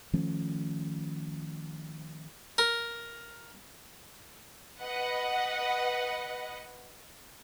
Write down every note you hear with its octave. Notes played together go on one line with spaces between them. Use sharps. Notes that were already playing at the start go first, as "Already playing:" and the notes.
D#3 F3 A3 C#4
A#4
B4 D#5 F#5